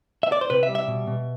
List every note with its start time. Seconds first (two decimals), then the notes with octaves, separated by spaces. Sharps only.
0.23 E5
0.32 D5
0.41 C5
0.50 C3 B4
0.63 E5
0.69 G3
0.75 E5
0.88 B2
1.07 B2